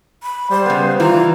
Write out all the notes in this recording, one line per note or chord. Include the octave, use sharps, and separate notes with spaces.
B5
G3 C5
C#3 B3
E3 F4 A#5